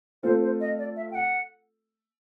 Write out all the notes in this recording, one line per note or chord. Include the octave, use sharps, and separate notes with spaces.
A3 C4 F4 A4 C5
C5
D#5
D5
E5
G5
F#5